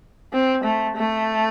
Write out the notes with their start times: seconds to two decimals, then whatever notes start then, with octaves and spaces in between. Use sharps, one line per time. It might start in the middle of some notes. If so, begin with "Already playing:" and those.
0.33 C4
0.64 A3
0.96 A3